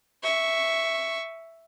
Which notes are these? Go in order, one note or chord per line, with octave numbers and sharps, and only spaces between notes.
E5 C#6